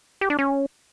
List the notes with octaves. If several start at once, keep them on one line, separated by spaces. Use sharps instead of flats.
G4
D4
C#4